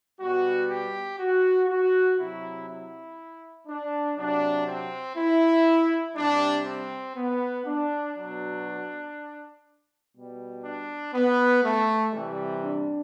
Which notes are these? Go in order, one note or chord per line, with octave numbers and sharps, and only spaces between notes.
B2 G3 F#4
G4
F#4
F#4
C3 F#3 E4
E4
D4
C3 F#3 D4
C4
E4
C3 G3 D4
C4
B3
D4
B2 F#3 D4
B2 G3
D4
B3
A3
C3 E3 G3
D4